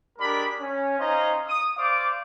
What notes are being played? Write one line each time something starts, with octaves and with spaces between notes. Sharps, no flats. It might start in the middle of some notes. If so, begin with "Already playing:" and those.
G#3 D4 G4 A#4 D5 B5
C#4
C#4 D#4 C5 D#5 F5 A#5
D#6
C5 D5 F5 C#6 D6